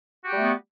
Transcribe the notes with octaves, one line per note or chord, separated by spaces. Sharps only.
G3 A3 B3 F#4 G4